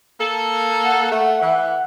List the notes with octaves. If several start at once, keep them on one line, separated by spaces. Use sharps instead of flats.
A#3 A4
F#5
A3
E3